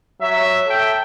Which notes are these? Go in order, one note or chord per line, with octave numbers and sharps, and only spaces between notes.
F#3 E5
A4 E5 G5